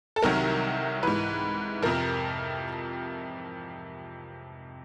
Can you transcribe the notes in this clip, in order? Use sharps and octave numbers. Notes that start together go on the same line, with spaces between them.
A4
C2 C3 D#3 F#3 A#4
G#2 E3 B4
F2 C3 F3 A#4